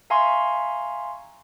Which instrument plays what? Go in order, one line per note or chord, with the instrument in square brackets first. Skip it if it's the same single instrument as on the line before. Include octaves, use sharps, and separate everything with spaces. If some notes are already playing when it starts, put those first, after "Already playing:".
[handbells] E5 F5 G#5 A#5 C6 C#6